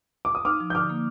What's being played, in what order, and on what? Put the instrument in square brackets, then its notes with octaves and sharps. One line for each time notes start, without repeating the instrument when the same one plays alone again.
[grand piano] D6
D#6
[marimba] D#4 [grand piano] D6 F6
[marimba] F3
[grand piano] G6
[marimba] D3 [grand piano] D6 F6
[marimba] A#3